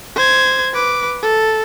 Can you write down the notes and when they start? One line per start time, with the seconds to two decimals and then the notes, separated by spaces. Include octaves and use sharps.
0.16 C5 G#6
0.73 B4 D6
1.22 A4